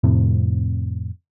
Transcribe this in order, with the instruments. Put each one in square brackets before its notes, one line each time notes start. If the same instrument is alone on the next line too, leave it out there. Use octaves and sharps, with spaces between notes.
[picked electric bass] F2 A2 C3